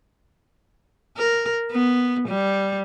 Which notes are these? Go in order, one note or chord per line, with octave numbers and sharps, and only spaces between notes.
A#4
B3
G3